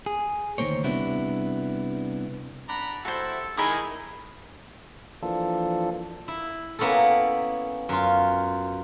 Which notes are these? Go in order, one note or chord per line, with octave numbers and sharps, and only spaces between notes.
G#4
D2 D#3 G#3 A#3 C5 C#5
C3 G3 B3 D4 E4
D4 F#5 A#5 B5
G3 E4 F#4 A4 C5
D#3 G#3 E4 A#4 G#5 B5 D#6
E3 F3 A#3 D4 F4 A4
E4
A#3 B3 C#4 E4 A4
F#2 F4